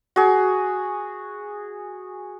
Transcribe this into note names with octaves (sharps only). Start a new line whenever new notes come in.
F#4 G#4